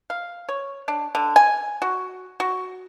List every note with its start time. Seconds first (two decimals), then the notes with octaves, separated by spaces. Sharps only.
0.10 F5
0.49 C#5
0.88 D4
1.15 D3
1.36 G#5
1.82 F#4
2.40 F#4